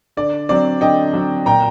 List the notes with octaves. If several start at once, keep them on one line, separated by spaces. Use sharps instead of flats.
D3 D5
F#3 C4 D5
D3 D#5 G5
F#3 C4
A#2 G5 A#5